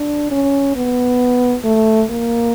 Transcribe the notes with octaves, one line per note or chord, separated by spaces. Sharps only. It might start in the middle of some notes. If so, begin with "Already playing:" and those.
Already playing: D4
C#4
B3
A3
A#3